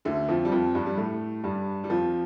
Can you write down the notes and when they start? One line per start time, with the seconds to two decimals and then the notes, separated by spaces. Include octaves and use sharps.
0.05 D2 D3
0.28 F2 F3
0.45 G3
0.52 F2 F3
0.75 G2 G3
0.86 G3
0.97 A2 A3
1.44 G2 G3
1.84 G3
1.89 F2 F3